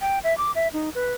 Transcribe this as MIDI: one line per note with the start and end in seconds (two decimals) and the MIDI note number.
0.01 0.19 79
0.24 0.36 76
0.38 0.52 86
0.55 0.68 76
0.73 0.90 63
0.95 1.14 71